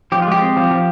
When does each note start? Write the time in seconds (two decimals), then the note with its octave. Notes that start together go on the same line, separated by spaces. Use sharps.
0.12 F3 G4
0.22 F4
0.27 G#3 G4
0.41 C4
0.57 F3
0.71 F3